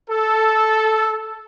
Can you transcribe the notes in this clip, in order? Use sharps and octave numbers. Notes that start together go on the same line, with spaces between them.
A4